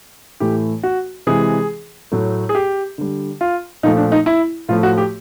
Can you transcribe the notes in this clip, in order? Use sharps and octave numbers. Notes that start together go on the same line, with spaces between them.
A2 E3 A3 G4
F#4
C3 E3 G#3 G#4
A2 F#3 A3
G#4
G4
D3 G3
F4
A#2 F3 A3 D#4
D4
D#4
E4
A2 F3 A3 F4
F#4
G4